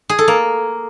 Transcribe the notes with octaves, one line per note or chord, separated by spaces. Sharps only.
G#4
A4
A#3